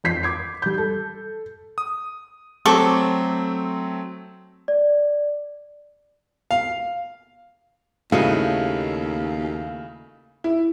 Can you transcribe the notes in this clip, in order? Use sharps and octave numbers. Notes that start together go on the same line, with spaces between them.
F2 F3 G6 B6 C7
D6 G#6 C7
G3 G6
A4
D#6
F#3 A3 C4 A4 C#6 D6
D5
F5
D#2 C#3 A3 E4 F#4 D#5 F5
E4